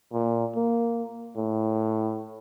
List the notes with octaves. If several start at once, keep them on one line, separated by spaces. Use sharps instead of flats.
A#2
A#3
A2